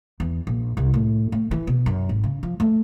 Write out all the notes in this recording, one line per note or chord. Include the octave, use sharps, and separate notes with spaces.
E2
A#1
C2
A2
A3
E3
B2
F#2
G#1
C#3
F3
A3